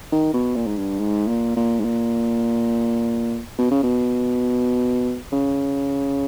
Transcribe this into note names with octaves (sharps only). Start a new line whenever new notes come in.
D#3
B2
A#2
G#2
G2
G#2
A#2
A#2
G#2
A#2
B2
C#3
B2
C#3